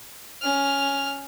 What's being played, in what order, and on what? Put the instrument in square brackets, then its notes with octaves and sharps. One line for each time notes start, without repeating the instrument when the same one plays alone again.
[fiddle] C#4 F6